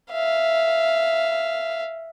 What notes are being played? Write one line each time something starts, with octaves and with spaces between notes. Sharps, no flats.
E5 F5